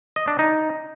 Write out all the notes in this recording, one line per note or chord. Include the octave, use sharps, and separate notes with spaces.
D#5
D4
D#4